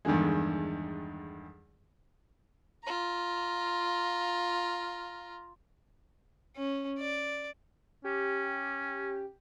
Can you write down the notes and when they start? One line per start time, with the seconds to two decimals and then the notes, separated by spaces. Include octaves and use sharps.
0.05 E2 G2 D3 D#3 G#3
2.84 F4 A#5
6.56 C#4
6.99 D5
8.04 C#4 G4